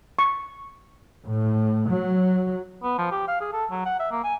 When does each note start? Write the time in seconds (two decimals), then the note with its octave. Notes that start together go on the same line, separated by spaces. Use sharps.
0.19 C#6
1.27 A2
1.90 F#3
2.83 B3
2.98 F3
3.11 G4
3.28 F5
3.41 G#4
3.53 A4
3.71 F#3
3.85 F#5
4.00 E5
4.11 A#3
4.24 G#5